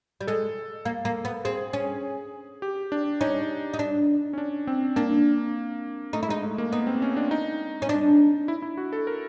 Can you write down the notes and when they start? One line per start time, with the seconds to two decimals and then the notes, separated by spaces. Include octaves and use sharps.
0.21 G3
0.27 G#3 A4
0.85 A#3
1.05 A#3
1.25 B3
1.45 C4 G#4
1.73 C#4
2.62 G4
2.92 D4
3.21 C#4 D#4
3.74 D#4
3.79 D4
4.33 C#4
4.38 D4
4.67 C4
4.96 A#3 D4
6.13 A3 D#4
6.23 E4
6.29 G#3 D#4
6.43 A3
6.58 A#3
6.72 B3 D#4
6.87 C4
7.02 C#4
7.17 D4
7.31 D#4
7.82 C#4
7.89 D4
8.48 E4
8.62 E4
8.77 F#4
8.93 A4
9.07 A#4